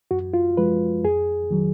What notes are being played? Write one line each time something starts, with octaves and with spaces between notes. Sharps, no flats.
F#2 F#4
F4
F3 G#3 B4
F2 G#4
D#3 F#3